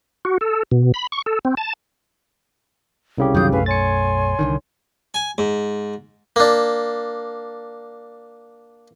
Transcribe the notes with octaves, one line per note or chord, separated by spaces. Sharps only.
F#4
A4
B2
B5
C#6
A4
C4
A5
C2 C#3 G4
F#2 D#3 F#3 F5 D#6 G6
B1 F#2 A3 B4 F5 G#5
C#5 G#5 C6 A6 C#7
C2 D3 D#3
G#5
G#2
A#3 D4